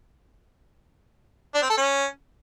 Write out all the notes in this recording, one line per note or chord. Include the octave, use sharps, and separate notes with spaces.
D4
C4
A4
C#4